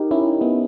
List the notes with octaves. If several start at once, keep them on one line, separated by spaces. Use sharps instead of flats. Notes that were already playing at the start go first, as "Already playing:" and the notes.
Already playing: D#4 G4 A#4
C#4 E4
B3 D#4